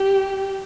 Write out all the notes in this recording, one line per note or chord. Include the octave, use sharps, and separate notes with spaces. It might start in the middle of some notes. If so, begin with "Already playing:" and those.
Already playing: G4